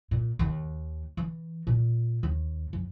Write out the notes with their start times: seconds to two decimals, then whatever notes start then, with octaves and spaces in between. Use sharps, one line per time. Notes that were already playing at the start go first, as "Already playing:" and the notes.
0.11 A#2
0.39 D#2
1.17 E3
1.67 A#2
2.23 D#2
2.73 F2